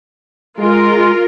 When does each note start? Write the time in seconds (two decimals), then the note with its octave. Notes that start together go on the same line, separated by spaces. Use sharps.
0.58 G#3 F4 A#4